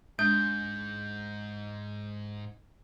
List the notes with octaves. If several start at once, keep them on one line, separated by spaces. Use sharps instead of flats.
G#2 G#3 D4 G6